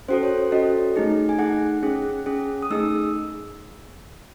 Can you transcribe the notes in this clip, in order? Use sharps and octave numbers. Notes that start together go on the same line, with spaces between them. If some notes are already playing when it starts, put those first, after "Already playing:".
C#4 F#4 A4 C5
C#5
C#5
C#4 F#4 A4 D#5
A3 D#4 G#4
G#5
A3 D#4 G#4 F#5
C#4 G#4
C#4 G#4
D#6
A3 D#4 G#4 E6